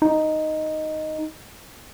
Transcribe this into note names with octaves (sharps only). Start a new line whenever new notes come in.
D#4